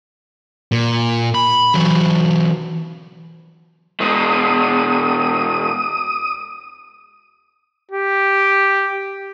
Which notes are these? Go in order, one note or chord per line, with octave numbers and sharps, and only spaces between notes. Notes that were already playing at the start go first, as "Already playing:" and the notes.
A#2
B5
E3 F#3
B2 G#3 D#6
G4